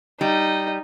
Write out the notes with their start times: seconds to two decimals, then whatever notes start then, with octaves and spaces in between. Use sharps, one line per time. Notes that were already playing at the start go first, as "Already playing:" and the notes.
0.21 G3 D#4